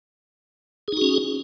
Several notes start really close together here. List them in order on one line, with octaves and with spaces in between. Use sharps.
G#4 D#4 F#4 C#4